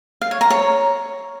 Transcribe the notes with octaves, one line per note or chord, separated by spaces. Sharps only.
F5
C#5
A#5
C#5